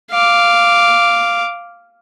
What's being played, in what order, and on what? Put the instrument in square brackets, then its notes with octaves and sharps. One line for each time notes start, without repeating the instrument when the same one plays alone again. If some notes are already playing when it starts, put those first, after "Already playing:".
[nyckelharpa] F5 D6